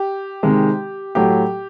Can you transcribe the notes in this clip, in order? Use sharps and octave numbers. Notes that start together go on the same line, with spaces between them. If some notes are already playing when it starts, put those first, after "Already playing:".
Already playing: G4
C3 D#3 G#3
A2 F#3 A3 G4